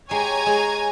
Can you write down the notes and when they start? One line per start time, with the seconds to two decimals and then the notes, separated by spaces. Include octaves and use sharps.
0.11 G#3 G4 C#5 G#5 A#5 C6
0.46 G#3 G#4